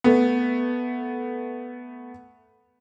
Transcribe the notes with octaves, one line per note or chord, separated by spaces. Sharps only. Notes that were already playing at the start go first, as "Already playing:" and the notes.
A3 B3